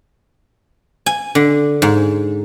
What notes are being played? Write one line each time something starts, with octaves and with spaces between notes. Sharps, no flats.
G#5
D3
G#2